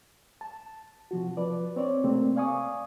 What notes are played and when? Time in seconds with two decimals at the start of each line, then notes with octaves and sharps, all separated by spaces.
0.41 A5
1.11 C3 F3 F#4
1.37 F3 B4 D5
1.76 C4 C#5 D5
2.04 C3 A3 A#3 C4
2.36 D5 F5 G#5 C#6 D#6